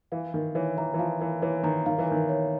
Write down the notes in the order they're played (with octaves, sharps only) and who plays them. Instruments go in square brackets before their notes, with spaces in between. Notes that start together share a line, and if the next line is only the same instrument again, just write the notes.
[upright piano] E3 [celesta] F5
[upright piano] D#3 [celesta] A#4
[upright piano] E3 [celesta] C#5
[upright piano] E3 [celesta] A#5
[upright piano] E3
[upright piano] F3 [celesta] F5
[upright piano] E3 [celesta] A#4
[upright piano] E3 [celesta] C#5
[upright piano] D#3 [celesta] A#5
[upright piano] D#3 [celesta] F5
[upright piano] E3
[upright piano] D#3 [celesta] A#4
[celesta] C#5